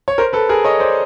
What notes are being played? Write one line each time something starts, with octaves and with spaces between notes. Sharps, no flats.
C#5
A#4 C5
A4 B4
G#4 A#4
C#5 D#5
C5 D5